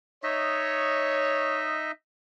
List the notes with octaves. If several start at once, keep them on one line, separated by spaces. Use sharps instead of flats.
D#4 C#5 D#5 E5